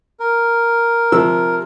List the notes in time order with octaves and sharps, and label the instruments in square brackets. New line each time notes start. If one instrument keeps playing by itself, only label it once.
[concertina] A#4
[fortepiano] C3 F3 E6